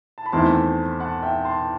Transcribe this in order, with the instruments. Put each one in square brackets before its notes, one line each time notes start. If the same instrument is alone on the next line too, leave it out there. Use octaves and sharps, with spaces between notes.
[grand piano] A5
B5
[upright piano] E2 D#3 A3 C4 E4 [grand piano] A5 C6
[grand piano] F#5 A5
E5 G5
A5 C6